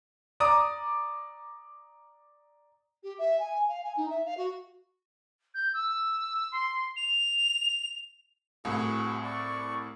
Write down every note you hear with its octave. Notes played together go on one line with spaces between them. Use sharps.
D5 A#5 D6 D#6
G4
E5
G#5
F5
G#5
D#4
E5
F5
F#4
G6
E6
C6
F7
C2 A2 F#4 G#4
D5 C#6